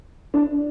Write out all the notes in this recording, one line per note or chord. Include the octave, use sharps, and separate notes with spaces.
D4